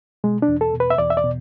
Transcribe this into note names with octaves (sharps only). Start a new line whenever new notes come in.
B2 G#3
D4
E2
A4
B2
B4
E5
E2 D5
E5
D5
B2